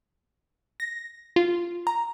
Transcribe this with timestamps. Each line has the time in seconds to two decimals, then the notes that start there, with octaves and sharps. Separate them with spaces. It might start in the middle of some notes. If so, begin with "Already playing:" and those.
0.80 A#6
1.36 F4
1.87 A#5